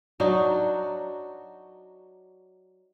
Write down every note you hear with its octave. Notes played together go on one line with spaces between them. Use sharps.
F#3 D4 D#4 F#4